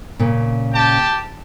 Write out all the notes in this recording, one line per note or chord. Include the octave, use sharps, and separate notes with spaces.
A#2 C#3
G4 G5 A5